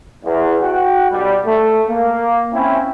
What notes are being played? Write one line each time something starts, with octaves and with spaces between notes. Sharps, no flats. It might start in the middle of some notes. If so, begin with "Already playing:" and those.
E2
F#4 F#5 G5
B1 G3
A3
A#3
C4 C#4 E4